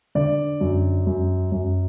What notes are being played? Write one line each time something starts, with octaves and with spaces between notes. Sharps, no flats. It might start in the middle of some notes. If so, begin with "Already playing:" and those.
D3 D5
F#2
F#2
F#2